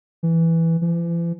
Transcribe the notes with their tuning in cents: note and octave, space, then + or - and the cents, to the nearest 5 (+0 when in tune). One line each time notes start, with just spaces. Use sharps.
E3 +0
E3 +45